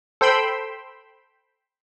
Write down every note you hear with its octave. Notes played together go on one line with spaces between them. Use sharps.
A4 C5 G5 B5 C6 E6